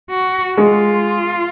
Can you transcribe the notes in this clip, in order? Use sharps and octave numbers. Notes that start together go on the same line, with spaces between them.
F#4
G#3 F4